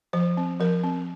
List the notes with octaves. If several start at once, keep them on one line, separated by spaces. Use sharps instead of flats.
F3 C5
C4
F3 A#4
C4